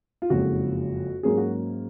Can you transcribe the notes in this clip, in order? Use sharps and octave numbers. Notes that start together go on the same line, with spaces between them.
F4
F#1 F2 C#3 G#3 F#4
G#2 F#3 A#3 C#4 G#4
F#4